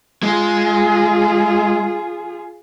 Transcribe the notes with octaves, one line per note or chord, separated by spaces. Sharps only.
G#3 F4 G#4